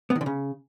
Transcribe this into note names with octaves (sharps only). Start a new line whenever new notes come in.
B3
D#3
D3
C#3